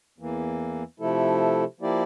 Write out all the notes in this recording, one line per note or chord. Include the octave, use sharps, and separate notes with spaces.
E2 E3 A#3
C3 F3 A3 E4 A4
F3 A#3 E4 G4 D5